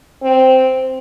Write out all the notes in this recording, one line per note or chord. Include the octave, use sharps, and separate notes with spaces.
C4